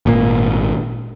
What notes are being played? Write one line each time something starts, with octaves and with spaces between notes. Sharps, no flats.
G#1 A#2 A#3